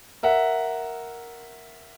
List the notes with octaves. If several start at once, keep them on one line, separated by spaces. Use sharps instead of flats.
A#4 E5 F#5